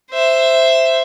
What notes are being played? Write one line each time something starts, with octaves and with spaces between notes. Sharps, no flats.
C5 E5